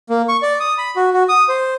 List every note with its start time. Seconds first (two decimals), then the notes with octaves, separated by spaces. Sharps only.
0.10 A#3
0.29 C#6
0.42 D5
0.60 D#6
0.78 B5
0.96 F#4
1.13 F#4
1.29 D#6
1.49 C5